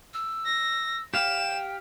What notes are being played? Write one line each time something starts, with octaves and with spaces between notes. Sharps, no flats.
E6
A#6
G4 F5 G5 E7